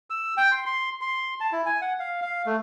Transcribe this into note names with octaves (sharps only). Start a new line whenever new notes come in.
E6
G5
C6
C6
C6
A5
E4
G#5
F#5
F5
F5
A3